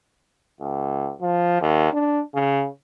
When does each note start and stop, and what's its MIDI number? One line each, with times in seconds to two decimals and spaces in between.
0.61 1.13 37
1.21 1.60 53
1.62 1.92 39
1.93 2.21 62
2.34 2.68 49